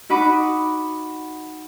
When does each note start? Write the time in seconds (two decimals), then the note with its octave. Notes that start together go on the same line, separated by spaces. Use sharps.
0.09 D#4 F#4 F#5 B5 D6 D#6